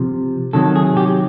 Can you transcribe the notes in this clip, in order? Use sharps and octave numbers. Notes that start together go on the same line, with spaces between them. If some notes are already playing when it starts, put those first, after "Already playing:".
Already playing: C3 F3
C3 D#3 F#3 A4
G#4
G4